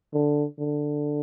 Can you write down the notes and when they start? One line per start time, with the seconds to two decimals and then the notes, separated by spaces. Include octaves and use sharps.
0.13 D3
0.59 D3